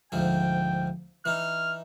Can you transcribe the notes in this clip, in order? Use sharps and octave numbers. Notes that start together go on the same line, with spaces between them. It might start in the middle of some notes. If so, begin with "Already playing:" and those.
D2 G#2 F3 G5
E3 D#4 F6